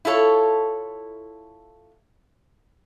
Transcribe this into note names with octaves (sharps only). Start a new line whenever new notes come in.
E4 F4 A4 C#5